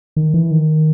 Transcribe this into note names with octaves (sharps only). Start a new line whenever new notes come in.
D#3
E3
D#3